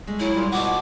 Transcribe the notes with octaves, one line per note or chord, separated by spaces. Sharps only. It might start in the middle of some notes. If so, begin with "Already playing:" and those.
G#3 A3
F#3 E4
A#2 G3
B2 F#4 D5 D6